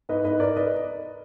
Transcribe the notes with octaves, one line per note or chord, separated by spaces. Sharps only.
G#2 B4 D#5
G#2 B4 D#5
G#2 A#4 D5
B4 D#5